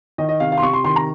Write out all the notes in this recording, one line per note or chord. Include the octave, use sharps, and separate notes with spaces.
D#3 D#5
D#5
C3 F5
F5
C6
C3 C#6
C6
D#3 C6
A#5